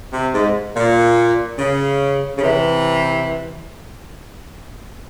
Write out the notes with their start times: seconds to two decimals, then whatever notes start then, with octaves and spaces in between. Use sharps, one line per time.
0.12 C3
0.33 G#2
0.76 A#2
1.58 C#3
2.38 C#3
2.42 C3 E3